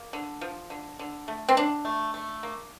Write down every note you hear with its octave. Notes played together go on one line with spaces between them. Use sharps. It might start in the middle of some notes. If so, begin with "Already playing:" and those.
Already playing: A#3
D3
F3
D3
D3
A3
C4
D3 D4
A3
A3
A#3